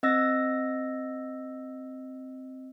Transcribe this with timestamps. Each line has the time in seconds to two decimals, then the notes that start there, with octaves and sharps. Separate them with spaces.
0.03 C4 D#5 E6 A#6